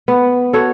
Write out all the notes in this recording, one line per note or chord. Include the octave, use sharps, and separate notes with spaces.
B3
F#4 A4 C#5